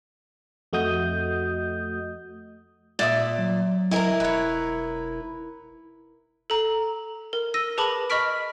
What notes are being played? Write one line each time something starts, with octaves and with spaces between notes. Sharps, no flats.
F2 A3 F#4 D#5 D#6 G6
A#2 D5 E5 D#6
F#3
E4 A#4 D#5 G#5 A#5
E1 B4 C#5
A4 A#5
A#4
E6 A#6 D#7
G#4 B4 A5 B5 D6 F#7
D#5 B5 C#6 F6 B6 D7